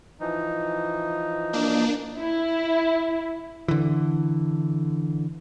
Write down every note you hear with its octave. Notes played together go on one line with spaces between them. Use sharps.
E3 F3 D#4
A#3 D4
E4
D3 E3